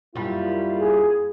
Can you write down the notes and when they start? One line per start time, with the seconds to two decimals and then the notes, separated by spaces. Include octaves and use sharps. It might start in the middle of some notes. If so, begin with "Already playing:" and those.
0.15 F#2 G3 A#3 E4 F4
0.77 G#4